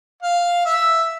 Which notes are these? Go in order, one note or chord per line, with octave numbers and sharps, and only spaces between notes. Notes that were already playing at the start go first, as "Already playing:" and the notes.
F5
E5